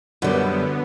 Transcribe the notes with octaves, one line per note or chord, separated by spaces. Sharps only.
F#2 D3 G3 B3